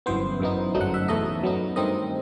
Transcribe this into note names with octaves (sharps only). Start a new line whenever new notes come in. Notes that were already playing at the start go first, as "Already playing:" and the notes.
G1 F#2 E3 B3 C5
F#2 E3 B3 D#4
G1 F#2 F#3 A3 D#4
F#5
E5
E2 B2 A3 D#4 D#5
F#2 F#3 B3 D#4
G2 D#3 A3 C4 D#4 D#5